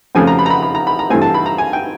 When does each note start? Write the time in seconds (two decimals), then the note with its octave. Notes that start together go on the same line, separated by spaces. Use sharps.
0.15 F2 C#3 F3 A3 C4 G#5
0.27 A#5
0.39 B5
0.46 A#5
0.50 B5
0.63 B5
0.75 A#5
0.87 B5
0.99 A#5
1.10 G2 E3 A3 C4 G#5
1.22 A5
1.34 B5
1.46 A#5
1.58 G#5
1.73 G5